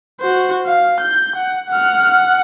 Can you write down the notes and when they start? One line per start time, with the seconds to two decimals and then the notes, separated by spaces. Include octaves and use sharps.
0.21 F#4 C5
0.66 F5
1.00 G6
1.36 F#5
1.69 F#5 F6
2.11 F#5